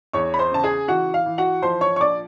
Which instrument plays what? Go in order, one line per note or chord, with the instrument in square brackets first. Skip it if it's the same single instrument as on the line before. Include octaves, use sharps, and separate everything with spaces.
[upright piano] E2 C#5 C#6
B5
C5 C6
C#3 A5
G#4 G#5
E3 F#4 F#5
F5
E3
F#4 F#5
F3 C5 C6
C#5 C#6
C#6
A#1 D5 D6